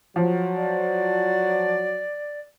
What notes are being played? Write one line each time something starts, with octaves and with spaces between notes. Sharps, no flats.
F3 F#3
D5